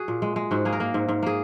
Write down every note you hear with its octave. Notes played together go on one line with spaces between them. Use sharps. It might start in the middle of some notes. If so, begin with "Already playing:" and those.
Already playing: F#4 G#4
A#2
G#3
G#3
G#2 F#4
A#3 G#4
A#4
A#3
G#2
G#2
A#3 G#4